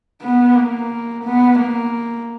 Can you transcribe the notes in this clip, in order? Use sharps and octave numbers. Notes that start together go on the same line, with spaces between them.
B3
A#3
B3
A#3